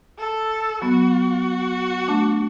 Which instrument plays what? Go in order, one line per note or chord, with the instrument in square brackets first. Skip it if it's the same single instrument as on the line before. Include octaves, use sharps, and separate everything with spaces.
[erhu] A4
[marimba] F#3 B3 [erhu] F#4
[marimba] A3 D4